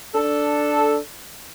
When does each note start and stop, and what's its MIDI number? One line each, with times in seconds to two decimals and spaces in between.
0.15 0.99 62
0.15 0.99 69